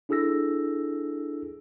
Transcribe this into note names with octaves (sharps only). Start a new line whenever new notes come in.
D4 E4 G#4 A4 E6 A#6